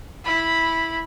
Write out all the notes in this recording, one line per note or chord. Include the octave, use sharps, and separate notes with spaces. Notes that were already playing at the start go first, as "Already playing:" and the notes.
E4 B5